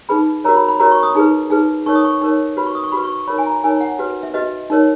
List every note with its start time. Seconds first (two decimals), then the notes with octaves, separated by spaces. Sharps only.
0.09 D#4 G#4 B4 B5
0.44 F#4 A#4 C#5 A#5
0.56 B5
0.68 B5
0.80 F#4 A#4 C#5 A#5
0.92 C#6
1.03 D#6
1.15 D#4 G#4 B4
1.50 D#4 G#4 B4
1.86 D#4 A#4 C#5 C#6
1.95 D#6
2.05 C#6
2.21 D#4 A#4 C#5
2.57 F#4 B4 B5
2.67 C#6
2.75 D#6
2.84 C#6
2.92 F#4 B4 B5
3.04 C#6
3.16 C#6
3.27 D#4 A#4 C#5 B5
3.38 G#5
3.46 A#5
3.64 D#4 A#4 C#5 G#5
3.81 F#5
3.99 F#4 B4
4.23 E5
4.34 F#4 B4 D#5
4.70 D#4 A#4 C#5